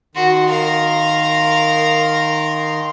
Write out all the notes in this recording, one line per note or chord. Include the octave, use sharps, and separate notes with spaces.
D#3 F#4 C6
A#4 F5